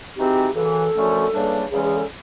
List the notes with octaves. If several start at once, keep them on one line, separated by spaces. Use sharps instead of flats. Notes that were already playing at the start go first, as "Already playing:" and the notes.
E3 G#3 C4 D#4 F#4 G4
F#2 C#3 E3 A4
F#2 D3 F3 A3 C#4
C#3 E3 G3 A#3 D4
E2 C#3 E3 G#3 C#4 G#4
G#4
A4